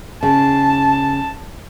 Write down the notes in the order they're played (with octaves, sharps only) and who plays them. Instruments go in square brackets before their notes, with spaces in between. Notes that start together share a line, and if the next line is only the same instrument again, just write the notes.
[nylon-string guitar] C#3 [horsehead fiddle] A5